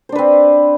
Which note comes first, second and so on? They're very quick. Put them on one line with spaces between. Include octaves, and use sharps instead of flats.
C5 D4 B4 C4